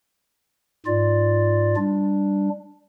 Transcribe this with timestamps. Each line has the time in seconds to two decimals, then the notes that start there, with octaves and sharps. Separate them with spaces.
0.86 G#2 F4 D5
1.76 G3 D4